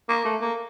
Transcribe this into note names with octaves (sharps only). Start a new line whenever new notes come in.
A#3
A3
A#3